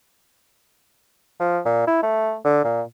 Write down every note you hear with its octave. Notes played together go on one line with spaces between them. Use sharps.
F3
A#2
E4
A3
D3
A#2